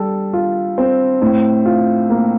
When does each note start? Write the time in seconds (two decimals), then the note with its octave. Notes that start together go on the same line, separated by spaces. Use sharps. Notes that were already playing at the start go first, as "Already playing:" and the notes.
Already playing: G3 A4
0.33 F4
0.78 C4
1.22 A2
1.65 F4
2.10 A#3